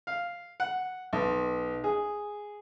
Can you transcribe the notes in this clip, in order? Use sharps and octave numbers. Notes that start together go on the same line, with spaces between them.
F5
F#5
B1
G#4